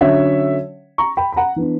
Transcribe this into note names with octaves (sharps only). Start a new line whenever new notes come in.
D3 F#3 C#4 C#5 E5
A#5 C#6
G5 B5
B5
F#5 A#5
E3 B3 D4